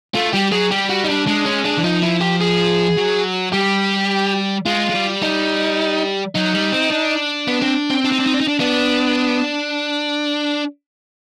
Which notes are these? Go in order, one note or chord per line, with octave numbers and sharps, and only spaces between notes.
A3 F4
G3 G4
F#3 G#4
G3 G4
F#4
D#4
D4
G#3 D4
C#4
D4
E3
F3 D#4
E4
G4
G#4
F#3
G3 G4
G#3 F4
G#3
G3
D#4
F#3 D#4
G3
C4
D4
B3
C4
C4
D4
D#4
D4
D#4
D4
D#4
D4
B3 D4